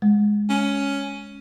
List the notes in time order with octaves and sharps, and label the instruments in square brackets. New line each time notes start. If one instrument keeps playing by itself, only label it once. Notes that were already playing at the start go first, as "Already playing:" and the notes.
[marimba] G#3
[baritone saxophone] C#4